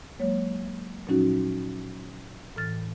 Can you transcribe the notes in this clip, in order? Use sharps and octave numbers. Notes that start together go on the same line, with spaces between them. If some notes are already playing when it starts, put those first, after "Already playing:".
F#3 G#3 A#3 C#5
A#2 F3 F#3 C#4 D#4 F#4
A2 E3 F6 A6